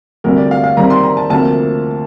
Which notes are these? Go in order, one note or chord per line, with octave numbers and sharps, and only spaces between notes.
D2 C3 G3 A#4
D5
F5
F5
C3 D#3 G3 C4 A#5
C6
A#5
A5
D2 C3 F3 A#3 A5